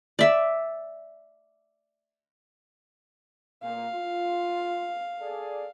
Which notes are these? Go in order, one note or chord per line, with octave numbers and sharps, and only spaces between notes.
D5 E5
A#2 A#3 F5
F4
G#4 A4 D5